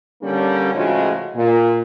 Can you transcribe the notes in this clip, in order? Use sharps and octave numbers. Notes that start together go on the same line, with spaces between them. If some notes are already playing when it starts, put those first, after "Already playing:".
D3 G3 A#3 C#4 D4
A2 C#3 F3 G#3 F#4
A#2